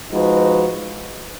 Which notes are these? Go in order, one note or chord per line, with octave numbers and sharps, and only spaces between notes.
F3 G#3 D#4 F#4 B4